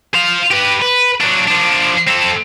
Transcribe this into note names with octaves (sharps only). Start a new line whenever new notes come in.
C5 F5
G4 B4
B4
F#3 D4
F3 D4
C4 A4